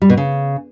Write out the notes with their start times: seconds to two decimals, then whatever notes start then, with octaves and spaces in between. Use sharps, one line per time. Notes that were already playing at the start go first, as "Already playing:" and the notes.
0.02 G3
0.09 B2
0.17 C#3